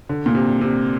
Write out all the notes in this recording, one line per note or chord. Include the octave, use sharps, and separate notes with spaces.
D3
A#2
C3
C3